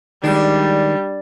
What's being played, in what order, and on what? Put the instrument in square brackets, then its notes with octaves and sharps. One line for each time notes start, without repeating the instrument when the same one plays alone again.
[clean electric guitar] D#3 G#3 [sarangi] G3 [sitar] D4